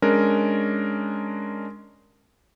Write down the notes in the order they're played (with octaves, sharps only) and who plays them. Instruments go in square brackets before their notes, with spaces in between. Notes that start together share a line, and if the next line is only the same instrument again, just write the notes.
[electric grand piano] G#3 C#4 D4 A#4